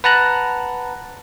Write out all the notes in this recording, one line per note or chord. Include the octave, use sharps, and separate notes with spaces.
B4 F#5 A5 A#5 F#6